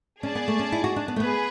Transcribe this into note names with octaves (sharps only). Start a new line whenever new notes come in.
C#4 G#4 D5 A5
B3
A3
C#4
E4
F#4
D4
B3
A3
B3 G#4 B4